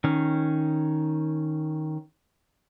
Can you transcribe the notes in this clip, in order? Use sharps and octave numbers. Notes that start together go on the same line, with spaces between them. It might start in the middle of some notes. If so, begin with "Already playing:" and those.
D#3 C#4